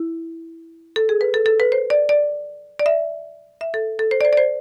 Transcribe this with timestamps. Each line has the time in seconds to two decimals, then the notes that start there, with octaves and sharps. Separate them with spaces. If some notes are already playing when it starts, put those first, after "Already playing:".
Already playing: E4
0.96 A4
1.09 G#4
1.21 B4
1.34 A4
1.46 A4
1.60 B4
1.72 C5
1.90 D5
2.09 D5
2.79 D5
2.86 E5
3.61 E5
3.74 A4
3.99 A4
4.11 C5
4.21 D5
4.25 C5
4.33 D5
4.37 C5